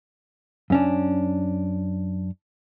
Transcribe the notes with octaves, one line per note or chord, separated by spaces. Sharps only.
F#2 C#4 D4